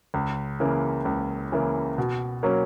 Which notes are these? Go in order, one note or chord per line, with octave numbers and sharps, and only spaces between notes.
C#2
C#3 E3 A#3
C#2
C#3 E3 A#3
B2
F#3 A#3 C#4